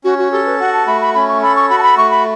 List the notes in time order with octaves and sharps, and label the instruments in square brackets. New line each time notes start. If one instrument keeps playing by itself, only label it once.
[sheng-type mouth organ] C#4 [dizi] F#4
[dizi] F#4
[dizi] G4 [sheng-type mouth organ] A4
[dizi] B4
[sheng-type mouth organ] F#4 [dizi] F#5
[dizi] A5
[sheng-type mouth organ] A3 [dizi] B5
[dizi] B5
[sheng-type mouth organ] C#4 [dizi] B5
[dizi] C#6
[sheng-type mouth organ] A4 [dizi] B5
[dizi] C#6
[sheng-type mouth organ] F#4 [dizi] B5
[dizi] A5
B5
[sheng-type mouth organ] A3 [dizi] C#6
[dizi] B5